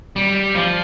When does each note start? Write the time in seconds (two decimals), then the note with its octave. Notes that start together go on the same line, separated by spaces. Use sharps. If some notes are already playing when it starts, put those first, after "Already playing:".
0.16 G3
0.54 F3